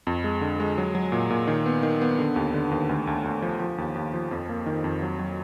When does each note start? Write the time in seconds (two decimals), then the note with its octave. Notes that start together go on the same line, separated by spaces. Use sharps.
0.07 F2
0.24 G#3
0.41 D3
0.60 G#3
0.78 F#3
0.95 F#3
1.12 A#2
1.30 A#2
1.47 D#3
1.66 B3
1.83 D#3
2.01 B3
2.19 D3
2.36 D#2
2.54 D3
2.71 D#2
2.89 D2
3.07 D2
3.24 D2
3.42 F3
3.60 F3
3.78 D#2
3.95 D#2
4.14 F3
4.31 F2
4.49 A#3
4.66 D#3
4.84 F2
5.02 F#3
5.19 F#3